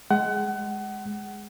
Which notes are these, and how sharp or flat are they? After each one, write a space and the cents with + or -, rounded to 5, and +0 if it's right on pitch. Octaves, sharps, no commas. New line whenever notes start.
G#3 +0 F#5 +30